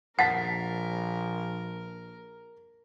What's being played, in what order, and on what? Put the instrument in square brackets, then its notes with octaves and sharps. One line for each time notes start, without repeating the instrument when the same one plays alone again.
[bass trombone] A#1 [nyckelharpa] A#4 [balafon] F#5 [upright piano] A5 A6 B6